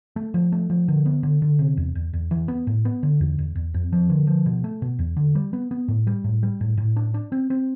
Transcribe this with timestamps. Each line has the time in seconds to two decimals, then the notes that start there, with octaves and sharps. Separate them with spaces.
0.16 A3
0.34 F3
0.52 A3
0.70 F3
0.88 D3
1.06 B3
1.23 D3
1.42 D3
1.59 C3
1.77 E2
1.95 E2
2.13 E2
2.31 E3
2.48 B3
2.67 A2
2.85 B3
3.03 D3
3.21 E2
3.39 E2
3.56 E2
3.74 F2
3.92 F3
4.10 D3
4.27 F3
4.46 B2
4.64 A3
4.82 B2
4.99 E2
5.16 D3
5.35 G3
5.53 B3
5.71 B3
5.88 A2
6.07 G3
6.24 A2
6.43 G3
6.61 A2
6.78 A2
6.96 D4
7.14 D4
7.32 C4
7.50 C4